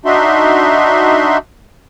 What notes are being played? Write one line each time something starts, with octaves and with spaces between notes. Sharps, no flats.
D4 D#4 F#4 E5 C6